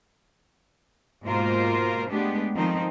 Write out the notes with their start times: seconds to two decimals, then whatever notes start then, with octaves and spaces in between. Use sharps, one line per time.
1.23 G#2 B2 A#3 F4 A#4 C5
2.08 G#3 A3 B3 D4 G4
2.55 D#3 F3 A3 C4 D#4